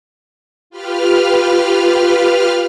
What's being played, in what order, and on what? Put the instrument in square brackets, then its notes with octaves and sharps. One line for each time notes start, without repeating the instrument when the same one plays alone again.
[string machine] F4 G4 B4 F6